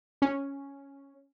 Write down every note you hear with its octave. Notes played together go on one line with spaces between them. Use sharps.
C#4